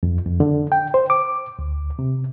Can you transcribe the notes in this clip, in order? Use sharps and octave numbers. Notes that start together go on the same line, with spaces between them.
F2
F2
D3
G5
C5
D6
D2
C3